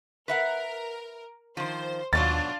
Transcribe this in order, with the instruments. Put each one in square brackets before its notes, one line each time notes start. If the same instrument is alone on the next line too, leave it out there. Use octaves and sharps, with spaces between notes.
[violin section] A#4 [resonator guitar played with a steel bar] B4 E5 F#5
[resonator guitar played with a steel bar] D#3 F3 [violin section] C5
[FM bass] D#2 [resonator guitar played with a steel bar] G#2 B2 F#3 [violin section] D4 F4 [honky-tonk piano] A6